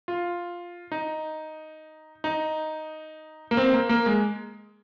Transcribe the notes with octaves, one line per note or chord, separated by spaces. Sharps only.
F4
D#4
D#4
A#3
C4
A#3
A#3
G#3